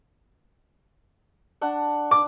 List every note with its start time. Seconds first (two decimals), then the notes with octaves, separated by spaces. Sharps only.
1.61 D4 F#5
2.11 D6